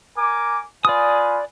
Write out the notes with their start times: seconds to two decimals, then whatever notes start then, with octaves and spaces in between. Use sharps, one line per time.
0.17 A#4 G#5 D6
0.85 F4 B4 D5 G#5 D#6